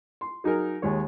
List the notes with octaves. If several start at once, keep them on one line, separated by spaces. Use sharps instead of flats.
C6
F#3 D#4 G#4 A#4
D#2 G#3 C#5